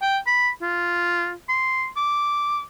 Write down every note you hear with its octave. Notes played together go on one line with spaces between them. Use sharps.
G5
B5
F4
C6
D6